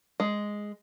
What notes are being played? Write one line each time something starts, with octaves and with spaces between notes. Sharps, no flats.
G#3